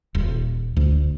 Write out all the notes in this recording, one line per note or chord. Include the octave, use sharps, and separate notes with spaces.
D#1
D2